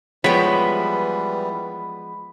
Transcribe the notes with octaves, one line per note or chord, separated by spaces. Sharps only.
E3 F3 G3 G#3 B3 C#5 G5 B5